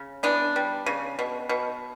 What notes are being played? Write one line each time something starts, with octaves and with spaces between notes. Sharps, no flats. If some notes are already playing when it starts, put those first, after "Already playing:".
Already playing: C#3
E3 B3 D4
G3
C#3
B2
B2